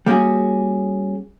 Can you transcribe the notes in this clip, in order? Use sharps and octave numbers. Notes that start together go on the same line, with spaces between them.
G3 A#3 C#4 F#4 G#4